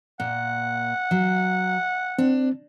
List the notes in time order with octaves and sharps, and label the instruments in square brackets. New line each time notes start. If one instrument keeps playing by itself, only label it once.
[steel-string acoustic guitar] A#2 [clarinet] F#5
[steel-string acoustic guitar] F#3
[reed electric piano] C4 [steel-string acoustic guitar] D4